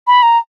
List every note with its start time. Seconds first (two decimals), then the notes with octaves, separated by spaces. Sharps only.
0.07 B5
0.23 A#5